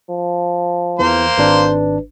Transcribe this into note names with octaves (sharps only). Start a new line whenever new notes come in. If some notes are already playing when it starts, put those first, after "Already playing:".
F3
E2 E3 A#3 C5
G#1 D4 B4